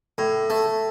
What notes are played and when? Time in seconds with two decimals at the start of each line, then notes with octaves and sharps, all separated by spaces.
0.18 A2
0.50 A3